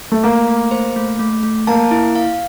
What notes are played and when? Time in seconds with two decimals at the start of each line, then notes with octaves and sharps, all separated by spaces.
0.12 A3
0.23 A3 A#3
0.47 A3
0.71 C5
0.96 A3
1.19 A3
1.43 A3
1.67 A#3 A5
1.91 E4
2.15 F5